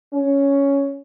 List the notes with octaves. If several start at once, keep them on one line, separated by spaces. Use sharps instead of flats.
C#4